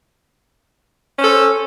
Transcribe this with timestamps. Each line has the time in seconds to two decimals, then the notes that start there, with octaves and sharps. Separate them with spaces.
1.17 C#4
1.20 C5
1.23 A4